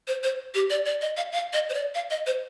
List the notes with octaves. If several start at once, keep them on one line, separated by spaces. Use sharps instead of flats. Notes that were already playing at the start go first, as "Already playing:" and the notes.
C5
C5
G4
D5
D5
D#5
F5
F5
D#5
C5
D5
F5
D#5
C5